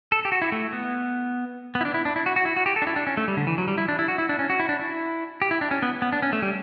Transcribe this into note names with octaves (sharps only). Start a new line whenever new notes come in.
A4
G4
F#4
E4
A3
B3
B3
E4
D4
E4
D4
E4
F#4
F#4
E4
F#4
G4
A4
D4
E4
D4
C#4
A3
G3
D3
E3
F#3
G3
E4
D4
E4
F#4
E4
D4
C#4
F#4
E4
D4
E4
G4
E4
D4
C#4
B3
B3
D4
C#4
A3
G3